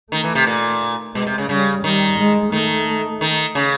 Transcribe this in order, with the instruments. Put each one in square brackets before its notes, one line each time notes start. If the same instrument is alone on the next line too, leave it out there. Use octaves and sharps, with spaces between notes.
[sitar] D#3 [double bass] A3
[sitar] E3
C3
A#2
[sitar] B2 [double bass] G#3
[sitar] C3
C#3
[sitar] C#3 [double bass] G3
[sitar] D#3 [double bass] G3
[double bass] G#3
[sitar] D#3 [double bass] A3
[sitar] D#3
C#3